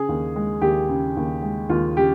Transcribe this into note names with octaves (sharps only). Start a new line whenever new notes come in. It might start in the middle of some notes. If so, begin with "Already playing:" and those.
Already playing: C#3 G#4
D#2
G#3
D#2 G4
C#3
D#2
G#3
D#2 F4
C#3 G4